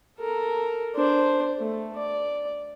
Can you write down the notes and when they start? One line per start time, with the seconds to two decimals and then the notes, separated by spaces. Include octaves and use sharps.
0.19 A4 A#4
0.95 D4 C5
1.57 A3
1.96 D5